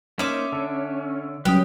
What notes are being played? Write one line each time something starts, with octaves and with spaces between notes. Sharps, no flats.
A#3 C#4 D#4 C5 E5 D6
D3 A4
F#3 G3 C#4 G4 B4 G5 D#6